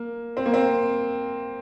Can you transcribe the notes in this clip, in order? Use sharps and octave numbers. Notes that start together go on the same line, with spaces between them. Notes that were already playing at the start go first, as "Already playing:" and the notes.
Already playing: A#3
C4
A#3
C4